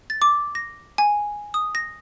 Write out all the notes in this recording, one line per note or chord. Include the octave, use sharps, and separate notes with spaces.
A6
D6
A#6
G#5
D#6
A#6